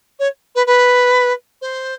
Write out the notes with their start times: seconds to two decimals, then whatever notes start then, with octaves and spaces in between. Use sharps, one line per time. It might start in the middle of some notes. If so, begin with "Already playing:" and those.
0.19 C#5
0.55 B4
0.66 B4
1.61 C5